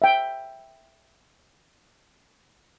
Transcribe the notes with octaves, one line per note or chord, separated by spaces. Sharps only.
E5 G5